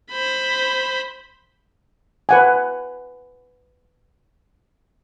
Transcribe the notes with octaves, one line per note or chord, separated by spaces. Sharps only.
C5 B5
B4 F#5 G#5